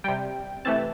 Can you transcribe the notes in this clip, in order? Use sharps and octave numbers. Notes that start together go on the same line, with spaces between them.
C3 G3 G5
C3 E3 A3 A5